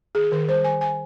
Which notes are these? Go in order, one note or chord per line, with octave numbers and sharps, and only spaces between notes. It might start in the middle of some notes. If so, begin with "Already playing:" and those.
D#3 G#4
D#3 A#4
G3 C5
D#3 G#5
D#3 G#5